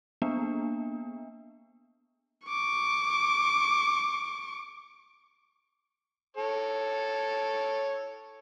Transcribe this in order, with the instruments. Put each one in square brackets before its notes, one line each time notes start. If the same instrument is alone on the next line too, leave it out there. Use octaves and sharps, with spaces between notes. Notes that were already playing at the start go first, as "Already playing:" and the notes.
[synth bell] A#3 B3 D4
[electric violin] C#6 D6
[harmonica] A4 C#5